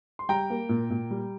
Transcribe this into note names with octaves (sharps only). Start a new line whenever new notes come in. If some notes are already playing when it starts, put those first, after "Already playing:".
C6
G3 G5 A#5
A#3
A#2
A#2
G3